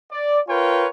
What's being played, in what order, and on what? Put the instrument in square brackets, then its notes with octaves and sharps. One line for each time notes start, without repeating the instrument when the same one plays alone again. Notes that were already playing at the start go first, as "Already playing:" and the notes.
[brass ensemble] D5
F4 A#4 B4 C#5 G5